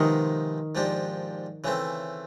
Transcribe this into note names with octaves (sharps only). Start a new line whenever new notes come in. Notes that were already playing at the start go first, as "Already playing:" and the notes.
Already playing: C3 D#3 F3 G#3 B3 D#4
G#2 F3 A#3 D4 G4
C#3 E3 A3 C4